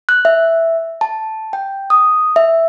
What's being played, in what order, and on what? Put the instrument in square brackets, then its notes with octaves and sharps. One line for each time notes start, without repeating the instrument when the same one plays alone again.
[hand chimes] F#6
E5
A5
G5
D#6
E5